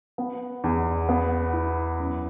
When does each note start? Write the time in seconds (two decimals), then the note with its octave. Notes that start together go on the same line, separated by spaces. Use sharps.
0.18 B3
0.64 E2
1.09 B3
1.53 E4
2.00 F#2